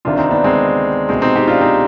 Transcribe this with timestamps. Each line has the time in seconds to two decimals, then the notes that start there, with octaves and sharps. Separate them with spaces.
0.05 D2 C3 D#3 D4 F4
0.18 C4 D#4
0.31 B3 D4
0.44 G#3 C4
1.09 C2 B2 G#3 C4
1.22 C4 D#4
1.35 D#4 G4
1.48 D4 F4
1.61 C4 D#4